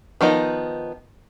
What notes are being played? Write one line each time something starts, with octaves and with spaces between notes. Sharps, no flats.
D#3 F3 B3 D#4